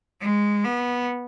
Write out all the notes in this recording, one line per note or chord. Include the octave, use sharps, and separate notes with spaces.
G#3
B3